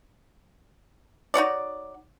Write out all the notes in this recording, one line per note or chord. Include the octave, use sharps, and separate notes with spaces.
D#4 F#4 C#5 D5